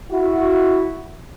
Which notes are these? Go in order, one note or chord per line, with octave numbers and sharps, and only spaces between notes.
E4 F#4